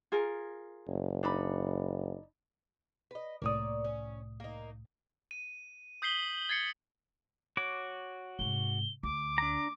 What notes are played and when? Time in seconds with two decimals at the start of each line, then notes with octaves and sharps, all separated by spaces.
0.12 F4 G#4 A#4
0.88 F#1
1.23 D4 D#4 B5
3.11 B4 D#5
3.42 C2 A2 A#3 C#5 D5 D#6
3.84 C#4
4.40 A#3 D#4
5.31 D#7
6.02 D#6 G6 B6 C7 F#7 G7
6.49 G#6 A6 C7 C#7
7.57 F#4 C#5 D6
8.39 G#2 C3 G7
9.03 D2 D6
9.38 D4 A#5